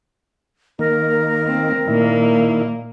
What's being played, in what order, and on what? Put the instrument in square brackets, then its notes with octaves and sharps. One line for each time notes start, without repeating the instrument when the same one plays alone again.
[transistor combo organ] D#3 A#3 [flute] A#4
[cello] C4
[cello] A#2 A#3 [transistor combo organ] D#3 E4